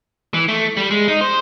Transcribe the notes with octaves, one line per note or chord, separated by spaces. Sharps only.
E3
A3
G3
G#3
D#4
C5